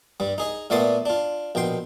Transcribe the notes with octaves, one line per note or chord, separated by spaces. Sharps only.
G2 G3
D#4 G#4 D#5
A#2 A3 B3 D5 C6 D#6
D4 F4
A#1 B2 G5 C6